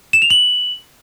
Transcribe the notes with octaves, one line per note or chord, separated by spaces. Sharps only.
E7
F7
F#7